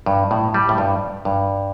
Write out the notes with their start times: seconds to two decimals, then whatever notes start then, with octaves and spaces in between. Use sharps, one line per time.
0.06 G2
0.31 A2
0.54 G3
0.69 A2
0.78 G2
1.25 G2